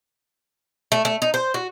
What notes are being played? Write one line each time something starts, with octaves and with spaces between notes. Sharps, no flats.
A3
A3
D#4
C5
F#4